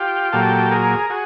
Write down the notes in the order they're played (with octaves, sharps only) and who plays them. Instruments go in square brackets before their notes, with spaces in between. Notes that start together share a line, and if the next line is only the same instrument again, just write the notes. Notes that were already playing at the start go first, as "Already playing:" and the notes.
Already playing: [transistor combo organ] F4 G4
A#2 F#3 G4 A4
G#4 A#4
F#4 G#4